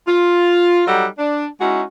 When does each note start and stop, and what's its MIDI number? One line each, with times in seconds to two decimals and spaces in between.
0.07 0.82 65
0.87 1.07 54
0.87 1.07 55
0.87 1.07 63
0.87 1.07 69
0.87 1.07 78
1.19 1.48 62
1.61 1.83 56
1.61 1.83 61
1.61 1.83 63
1.61 1.83 64
1.61 1.83 66